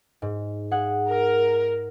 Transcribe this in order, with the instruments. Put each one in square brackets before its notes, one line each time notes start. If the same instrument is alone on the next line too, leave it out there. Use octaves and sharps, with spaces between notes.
[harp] G#2
G#4 F#5
[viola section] A#4